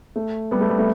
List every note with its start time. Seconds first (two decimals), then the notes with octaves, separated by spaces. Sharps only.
0.16 A3
0.51 G3 B3
0.61 A3
0.69 G3
0.79 A3